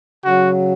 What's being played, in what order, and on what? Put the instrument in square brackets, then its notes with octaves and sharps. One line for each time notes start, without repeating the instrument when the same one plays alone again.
[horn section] C#3 F#3 F#4